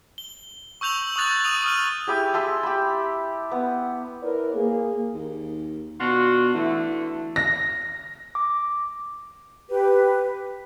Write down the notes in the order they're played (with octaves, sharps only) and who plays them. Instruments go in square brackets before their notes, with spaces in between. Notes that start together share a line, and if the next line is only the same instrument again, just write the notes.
[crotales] G7
C#6 E6 G6 F7 F#7
C#6 D#6 F#6 A6 F7
D#6 D#7 F7
D#6 F6 D#7
[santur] E4 G4 G#4
G#4 E5 A5 C6
G4 B5
B3
[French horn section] E4 A#4 B4 C#5 D5
A#3 G#4
[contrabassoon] D#2
[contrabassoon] B2 [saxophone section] D4 F4 F#4
[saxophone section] D3 A3 [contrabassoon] E3
[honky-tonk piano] A#6
[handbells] D6
[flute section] G4 B4